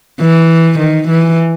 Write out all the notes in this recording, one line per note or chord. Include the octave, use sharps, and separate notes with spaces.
E3
D#3
E3